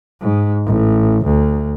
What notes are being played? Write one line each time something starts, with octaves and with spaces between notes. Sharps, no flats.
G#2
A1
D2